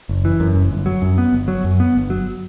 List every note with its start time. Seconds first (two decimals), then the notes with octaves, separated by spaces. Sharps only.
0.09 F#1
0.25 E3
0.40 F#2
0.55 F#1
0.71 G1
0.86 F#3
1.02 F#2
1.18 B3
1.33 G1
1.48 F#3
1.64 F#2
1.80 B3
1.95 G1
2.10 F#3